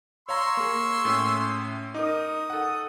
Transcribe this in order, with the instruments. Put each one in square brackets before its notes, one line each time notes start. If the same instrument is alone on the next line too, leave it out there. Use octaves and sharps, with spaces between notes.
[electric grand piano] C#5 F5 A#5 [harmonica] C6 C#6 E6
[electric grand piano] A#3 G#4
A2 C#4
[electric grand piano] D#4 A#4 [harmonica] D#6
[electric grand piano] A4 F#5